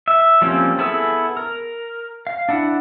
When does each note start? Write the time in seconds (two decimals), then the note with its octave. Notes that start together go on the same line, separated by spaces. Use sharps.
0.08 E5
0.42 F3 G3 A#3 C4 C#4
0.79 B3 E4 G#4 A4 E6
1.37 A#4
2.27 F5
2.49 D4 E4 F#5